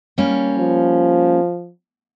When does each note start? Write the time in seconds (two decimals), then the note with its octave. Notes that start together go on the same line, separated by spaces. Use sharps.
0.18 G3 A#3 C#4
0.58 F3